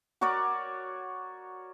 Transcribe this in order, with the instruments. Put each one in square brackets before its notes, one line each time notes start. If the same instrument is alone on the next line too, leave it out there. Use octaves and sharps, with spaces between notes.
[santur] F#4 A#4 C#5 D5